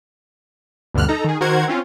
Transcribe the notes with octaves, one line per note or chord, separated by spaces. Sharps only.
D2 G2 B2 D3 F6 F#6
D#4 A4 A#5
D#3 G#4
D#3 F#4 A#4 C5 F#5 G#6
C4 C#4 F4